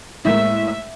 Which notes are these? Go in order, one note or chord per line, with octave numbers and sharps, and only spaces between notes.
A2 G#3 A#3 E5